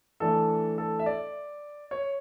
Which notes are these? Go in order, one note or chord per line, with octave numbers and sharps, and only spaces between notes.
E3 A3 D4 A4
A4
E5
D5
C#5